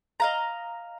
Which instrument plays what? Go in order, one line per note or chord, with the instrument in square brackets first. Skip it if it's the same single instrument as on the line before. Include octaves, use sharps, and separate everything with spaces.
[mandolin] D#5 F5 A#5